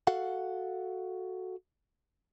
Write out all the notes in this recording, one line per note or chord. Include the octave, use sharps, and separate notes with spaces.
F#4 A4 F5 F#5